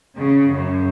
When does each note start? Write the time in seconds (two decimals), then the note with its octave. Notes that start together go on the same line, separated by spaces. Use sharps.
0.16 C#3
0.50 F#2